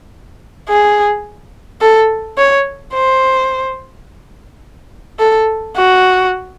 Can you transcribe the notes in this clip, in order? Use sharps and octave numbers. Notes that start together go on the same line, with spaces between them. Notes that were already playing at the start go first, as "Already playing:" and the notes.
G#4
A4
C#5
C5
A4
F#4